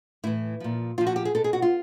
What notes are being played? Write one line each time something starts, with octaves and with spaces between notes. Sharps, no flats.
A2 E3 E4
A#2 F3
A#2 F3 F4
F#4
G4
G#4
B2 A4
G#4
F#4
F4